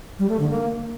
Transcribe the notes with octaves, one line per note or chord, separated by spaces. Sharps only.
G3
A3
D3
A#3